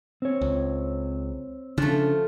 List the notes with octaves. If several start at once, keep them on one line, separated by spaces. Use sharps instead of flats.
C4 C#5
C#2
C#3 F3 A3 C#4 D4